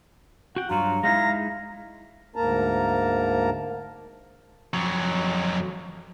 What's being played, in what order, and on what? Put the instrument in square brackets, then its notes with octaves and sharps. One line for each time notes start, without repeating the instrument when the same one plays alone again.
[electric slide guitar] F#4 G5 [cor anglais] F#5
[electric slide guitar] G2 F#3 F#4 [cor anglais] F4 [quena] A#5
[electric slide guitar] G#3 D#4 E4 [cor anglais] F5 [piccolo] A#6
[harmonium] D2 G#2 A#3 A#4 A5 A#5
[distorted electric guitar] F2 F#3